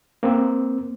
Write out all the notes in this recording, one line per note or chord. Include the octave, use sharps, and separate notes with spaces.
A#3 C4